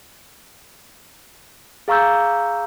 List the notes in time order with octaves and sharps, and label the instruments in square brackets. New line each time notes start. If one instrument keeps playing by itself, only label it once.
[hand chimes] G#4 F5 A#5 C#6 E6 G6